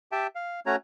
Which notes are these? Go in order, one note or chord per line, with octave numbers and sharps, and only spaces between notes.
G4 E5 G5 A5
F5
A3 C#4 F#4 C#5 A#5